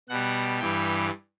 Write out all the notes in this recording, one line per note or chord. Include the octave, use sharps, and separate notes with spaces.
B2 G3 F#5
G2 E3 G3 G5